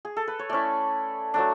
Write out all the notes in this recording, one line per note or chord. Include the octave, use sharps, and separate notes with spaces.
G#4
A4
B4
C#5
A3 C#4 E4 D5
F#3 A3 D4